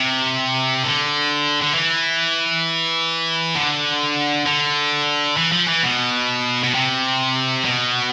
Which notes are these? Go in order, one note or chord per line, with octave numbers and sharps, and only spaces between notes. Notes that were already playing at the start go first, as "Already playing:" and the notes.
Already playing: C3
D3
D3
E3
D3
D3
E3
F3
E3
B2
B2
C3
B2